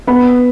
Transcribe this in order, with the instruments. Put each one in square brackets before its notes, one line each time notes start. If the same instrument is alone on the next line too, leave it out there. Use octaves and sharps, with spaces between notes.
[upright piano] B3 B5